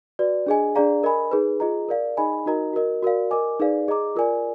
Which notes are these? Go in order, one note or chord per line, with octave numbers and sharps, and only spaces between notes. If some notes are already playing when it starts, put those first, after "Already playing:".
F#4 B4 D5
D4 G#4 D#5 G#5
D4 G#4 D5 F5 A#5
A#4 D#5 G#5 B5
D#4 G#4 B4
F4 G#4 D#5 A#5
A#4 D5 F5
D#4 G#4 D#5 G#5 B5
D#4 F#4 A#4 D#5 A#5
F#4 A#4 D#5
F#4 A#4 D5 F5
A#4 D#5 G#5 D6
D#4 G#4 B4 D5 F5
G#4 D#5 A#5 D6
F4 A#4 D5 G#5